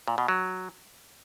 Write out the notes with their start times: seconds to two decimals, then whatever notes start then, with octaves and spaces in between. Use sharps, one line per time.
0.08 A#2
0.18 B2
0.28 F#3